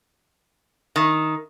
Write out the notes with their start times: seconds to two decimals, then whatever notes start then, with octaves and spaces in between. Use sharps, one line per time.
0.96 D#3